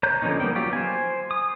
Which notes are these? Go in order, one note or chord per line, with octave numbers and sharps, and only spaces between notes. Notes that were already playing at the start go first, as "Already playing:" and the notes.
C#5 A#5 F#6 G6
D3 F3 B3 C#4 D#4
G3 A#3 B3 G5
F#3 F4 G4
C5 G#5
D#6